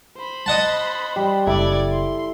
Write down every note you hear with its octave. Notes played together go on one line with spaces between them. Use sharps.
C5 B5
D#5 F#5 A5
G3
F#1 E4 A4 D5 G#6
C6